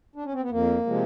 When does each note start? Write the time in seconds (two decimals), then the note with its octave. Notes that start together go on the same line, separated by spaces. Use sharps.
0.16 D4
0.24 C#4
0.33 C4
0.42 B3
0.49 F2 A#3
0.86 C3 F3 G#3